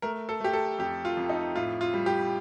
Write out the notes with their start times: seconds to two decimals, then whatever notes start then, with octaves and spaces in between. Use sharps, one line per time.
0.02 A3 A#4
0.29 A4
0.40 A3 G4
0.53 A4
0.79 F2 G4
1.05 F4
1.17 F2
1.29 D#4
1.55 A2 F4
1.81 F4
1.94 G3
2.06 G4